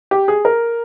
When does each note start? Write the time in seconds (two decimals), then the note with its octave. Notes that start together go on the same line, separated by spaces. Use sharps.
0.11 G4
0.28 G#4
0.45 A#4